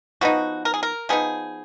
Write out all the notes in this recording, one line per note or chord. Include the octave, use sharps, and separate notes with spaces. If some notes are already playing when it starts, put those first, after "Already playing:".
F3 B3 D#4 F#4
A#4
G#4
A#4
F3 B3 D#4 G#4